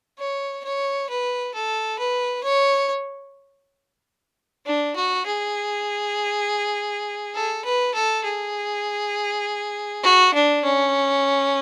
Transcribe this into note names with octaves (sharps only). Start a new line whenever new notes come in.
C#5
C#5
B4
A4
B4
C#5
D4
F#4
G#4
A4
B4
A4
G#4
F#4
D4
C#4